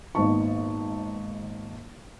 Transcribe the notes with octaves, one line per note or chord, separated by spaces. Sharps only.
G#1 A#2 B3 D#4 A5 C#6